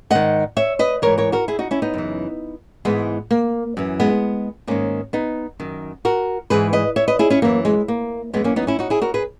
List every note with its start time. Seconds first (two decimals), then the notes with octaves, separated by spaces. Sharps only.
0.10 G#2 D#3 D#5 F#5
0.57 C#5 E5
0.79 B4 D#5
1.02 G#2 E3 A#4 C#5
1.18 A#4 C#5
1.32 F#4 A#4
1.48 E4 G#4
1.59 D#4 F#4
1.71 C#4 E4
1.82 B3 D#4
1.94 F#2 C#3 E3
2.85 G#2 E3 G#3 B3
3.31 A#3
3.77 F#2 E3
4.00 G#3 B3
4.67 G#2 D#3 A#3 C#4
5.13 B3 D#4
5.59 F#2 D#3
6.05 F#4 A#4
6.50 G#2 E3 G#4 B4
6.73 B4 D#5
6.96 C#5 E5
7.08 B4 D#5
7.19 E4 G#4
7.30 C#4 E4
7.42 F#2 E3 A#3
7.65 G#3
7.88 A#3
8.33 F#2 G#3 B3
8.37 E3
8.44 A#3 C#4
8.56 B3 D#4
8.67 C#4 E4
8.79 D#4 F#4
8.90 E4 G#4
9.02 F#4 A#4
9.14 G#4 B4